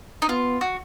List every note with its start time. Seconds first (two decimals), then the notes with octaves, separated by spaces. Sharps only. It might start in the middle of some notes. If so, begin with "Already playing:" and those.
0.22 D#4
0.29 B3 F4
0.61 F#4